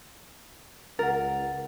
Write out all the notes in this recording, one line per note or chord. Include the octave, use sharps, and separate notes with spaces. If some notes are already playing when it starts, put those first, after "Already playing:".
C#2 A#4 F#5 A6